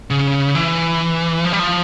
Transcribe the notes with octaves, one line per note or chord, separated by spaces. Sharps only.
C#3
E3
F3
G3
F3